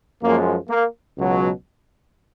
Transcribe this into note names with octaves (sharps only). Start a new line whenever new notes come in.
F#2 F3 G#3 A#3
A#3
C#2 B2 F#3